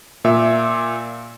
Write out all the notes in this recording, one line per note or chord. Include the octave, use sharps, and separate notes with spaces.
A#2 E5